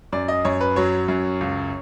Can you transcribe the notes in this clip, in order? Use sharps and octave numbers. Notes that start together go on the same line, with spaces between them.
F#2 D5
D#5
F#2 C#5
B4
F#3 C#5
F#2
C#2